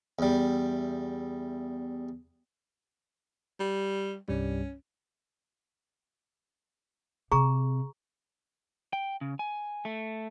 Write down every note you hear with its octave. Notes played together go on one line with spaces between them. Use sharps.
E2 G3
G3
C2 G2 G3 C#4
C3 G#4 A#5 C#6
G5
C#3
G#5
A3